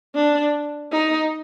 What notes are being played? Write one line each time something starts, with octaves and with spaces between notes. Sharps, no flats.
D4
D#4